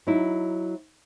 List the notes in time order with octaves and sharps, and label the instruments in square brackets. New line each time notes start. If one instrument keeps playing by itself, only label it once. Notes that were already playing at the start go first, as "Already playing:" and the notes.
[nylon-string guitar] F#3 D#4 E4